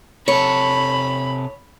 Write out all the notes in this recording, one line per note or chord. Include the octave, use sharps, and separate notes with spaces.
C3 A4 C#5 B5